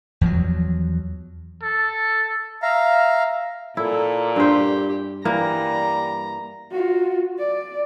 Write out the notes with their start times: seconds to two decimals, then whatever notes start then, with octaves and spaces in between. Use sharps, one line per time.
0.21 E2 F3 F#3
1.62 A4
2.62 E5 F5 A#5
3.77 A#2 E4 A4
4.36 G2 G4 C5
5.25 E3 G3 A#3 A#5
6.71 F4 F#4
7.39 D5